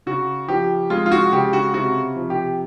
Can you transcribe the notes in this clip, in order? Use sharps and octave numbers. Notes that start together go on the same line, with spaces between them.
C#3 F#4
F3 G4
G#3 F4
F4
F#4
C#3 G4
F#4
C3 F#4
F3
G4